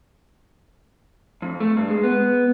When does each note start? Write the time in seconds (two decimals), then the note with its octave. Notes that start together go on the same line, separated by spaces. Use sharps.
1.42 F2
1.60 A3
1.77 G2
1.88 G#3
2.03 B3